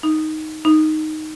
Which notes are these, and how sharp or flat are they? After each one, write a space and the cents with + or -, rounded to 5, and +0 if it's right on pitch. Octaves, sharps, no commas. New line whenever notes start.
D#4 +5
D#4 +0